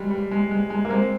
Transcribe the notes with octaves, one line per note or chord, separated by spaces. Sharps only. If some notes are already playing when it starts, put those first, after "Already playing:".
Already playing: G3 G#3
G3
G#3
G#3
G#3
A#3
G#3 C4